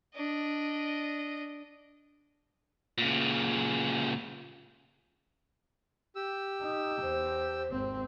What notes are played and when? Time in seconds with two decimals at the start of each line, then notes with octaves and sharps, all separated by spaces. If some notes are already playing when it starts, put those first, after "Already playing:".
0.15 D4 D#5
2.98 A#2 C#3
6.15 G4 E6
6.62 D#4
7.02 E2 C5
7.69 G#1 C4